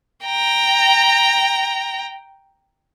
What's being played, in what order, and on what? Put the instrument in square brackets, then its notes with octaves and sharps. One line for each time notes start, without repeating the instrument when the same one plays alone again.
[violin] G5 A#5